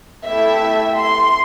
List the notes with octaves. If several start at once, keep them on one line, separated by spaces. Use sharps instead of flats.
A3 E4 G4 E5
C6